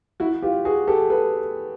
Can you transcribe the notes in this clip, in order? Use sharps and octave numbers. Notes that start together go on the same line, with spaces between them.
E4 F#4
F4 G4
F#4 G#4
G4 A4
A4 B4